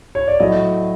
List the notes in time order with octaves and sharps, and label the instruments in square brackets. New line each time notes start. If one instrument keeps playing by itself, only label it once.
[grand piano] C#5
D5
A2 F#3 A3 D#5